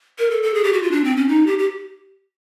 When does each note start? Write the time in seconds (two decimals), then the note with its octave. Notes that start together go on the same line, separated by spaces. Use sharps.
0.19 A#4
0.30 A4
0.43 A4
0.54 G#4
0.64 G4
0.73 F#4
0.82 F4
0.92 D4
1.04 C4
1.17 C#4
1.28 D#4
1.47 G4
1.59 G4